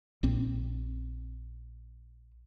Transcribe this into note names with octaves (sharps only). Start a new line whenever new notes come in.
A#1 C4